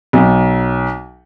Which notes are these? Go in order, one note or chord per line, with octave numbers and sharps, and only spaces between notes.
B1